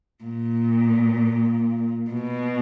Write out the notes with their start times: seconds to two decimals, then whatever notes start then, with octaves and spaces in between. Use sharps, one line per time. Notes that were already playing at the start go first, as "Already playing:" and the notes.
0.24 A#2
2.10 B2